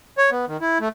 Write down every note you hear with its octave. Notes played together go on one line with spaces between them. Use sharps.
C#5
B3
D#3
E4
A3